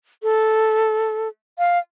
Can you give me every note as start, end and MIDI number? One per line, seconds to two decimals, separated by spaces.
0.23 1.28 69
1.58 1.79 77